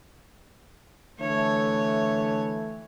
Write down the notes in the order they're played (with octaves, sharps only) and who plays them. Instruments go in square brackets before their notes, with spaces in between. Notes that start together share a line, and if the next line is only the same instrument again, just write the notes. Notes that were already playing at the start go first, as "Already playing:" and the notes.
[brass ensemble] D3 E3 A3 [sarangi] C#5